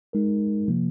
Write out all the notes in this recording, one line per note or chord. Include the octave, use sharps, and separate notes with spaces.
G#3 D#4 A#4
C3 F3 A#3